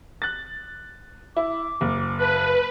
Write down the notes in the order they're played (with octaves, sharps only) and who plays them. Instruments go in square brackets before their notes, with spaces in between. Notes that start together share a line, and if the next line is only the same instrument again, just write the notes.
[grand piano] F#6 A6
[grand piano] E4 [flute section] D6
[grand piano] F#1
[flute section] G#4 A5 F#6 [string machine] B4